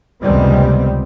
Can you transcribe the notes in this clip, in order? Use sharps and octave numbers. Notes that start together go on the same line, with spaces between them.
F1 C#2 D#3 G3 B3 C4